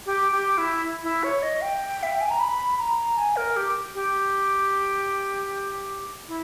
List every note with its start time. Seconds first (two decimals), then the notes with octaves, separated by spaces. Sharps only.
0.06 G4
0.32 G4
0.58 E4
1.03 E4
1.23 C#5
1.43 D#5
1.62 G5
2.03 E5
2.12 G5
2.21 G#5
2.30 A#5
2.40 B5
2.79 A#5
3.17 G#5
3.36 A#4
3.56 G4
3.94 G4
6.28 E4